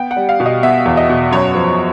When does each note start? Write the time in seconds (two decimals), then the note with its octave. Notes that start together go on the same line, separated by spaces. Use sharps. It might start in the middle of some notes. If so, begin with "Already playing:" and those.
Already playing: B3 G5
0.11 F#5
0.16 G3
0.29 F5
0.40 B2
0.46 D#5
0.63 B3 E5
0.85 E2
0.97 D#5
1.10 B2
1.31 F#2 C#5
1.55 F3